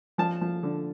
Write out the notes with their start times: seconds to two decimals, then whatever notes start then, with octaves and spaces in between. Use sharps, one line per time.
0.18 F3 A5
0.41 F3
0.63 D3